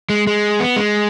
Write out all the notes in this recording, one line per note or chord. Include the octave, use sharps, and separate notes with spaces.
G#3
G#3
B3
G#3